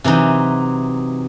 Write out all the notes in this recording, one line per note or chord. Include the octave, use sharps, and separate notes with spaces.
C3 E3 F#3 D#4